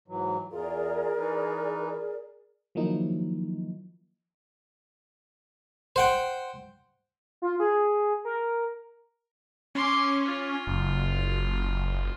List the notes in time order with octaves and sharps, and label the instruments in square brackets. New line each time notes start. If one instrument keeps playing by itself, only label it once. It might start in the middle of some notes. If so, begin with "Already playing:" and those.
[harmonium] G#2 E3 F#3
[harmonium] E2 F4 [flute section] G#4 A#4 D5
[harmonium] E3 D#4 B4
[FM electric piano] D#3 F3 F#3 A#3 D#4 E4
[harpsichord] C5 F#5 G5
[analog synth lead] F4
G#4
A#4
[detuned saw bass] C#4 [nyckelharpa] C6 D6
[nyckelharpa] F4
[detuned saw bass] F#1